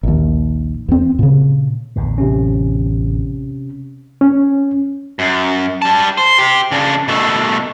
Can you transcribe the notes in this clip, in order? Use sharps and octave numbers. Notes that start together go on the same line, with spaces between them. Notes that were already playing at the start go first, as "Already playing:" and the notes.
A#1 D#2
E2 C4
A#2 C#3
A1 E2 D3
C3 C#4
C#4
F#2
G3 A5
C5
G4 C5
C#3 D4
B2 A3